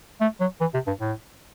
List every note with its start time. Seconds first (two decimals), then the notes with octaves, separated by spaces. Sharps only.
0.21 A3
0.40 F#3
0.61 E3
0.74 C3
0.87 G2
1.01 A2